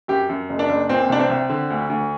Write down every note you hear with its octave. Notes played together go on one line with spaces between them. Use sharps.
F#2 G4
F#2
F#1
D4
F#1
A#2 C4
C2 D4
C4
C2
D3
D2
D2